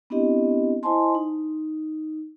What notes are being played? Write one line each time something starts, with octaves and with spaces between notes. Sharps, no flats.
B3 C4 D4 E4 G4 D#5
E4 C5 D#5 G#5 A5 C6
D#4